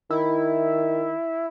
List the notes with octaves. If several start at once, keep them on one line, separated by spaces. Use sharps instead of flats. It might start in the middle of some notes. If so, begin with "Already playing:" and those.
D#3 E4